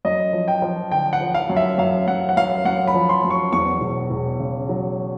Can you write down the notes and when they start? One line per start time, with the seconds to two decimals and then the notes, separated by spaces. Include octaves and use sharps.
0.05 F#2 D#5
0.33 F3
0.48 G5
0.62 F3
0.91 D3 G5
1.13 F#5
1.21 F3
1.34 F5
1.49 F#2
1.57 E5
1.78 F#2 F5
2.07 F#2 F#5
2.29 F#5
2.37 F#2 F5
2.65 F#2 F#5
2.87 B5
2.94 F3
3.09 C6
3.24 F#2
3.30 C#6
3.52 E2 C#6
3.81 E1
4.10 E1
4.39 C#3
4.69 F#3